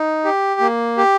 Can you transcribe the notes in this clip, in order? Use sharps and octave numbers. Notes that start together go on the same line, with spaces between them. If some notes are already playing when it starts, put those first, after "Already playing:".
Already playing: D#4
G4
A#3
G4